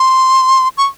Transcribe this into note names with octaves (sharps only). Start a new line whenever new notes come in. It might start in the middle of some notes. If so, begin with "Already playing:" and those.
Already playing: C6
C#6